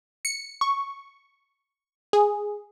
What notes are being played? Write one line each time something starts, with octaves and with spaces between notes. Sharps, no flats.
C#7
C#6
G#4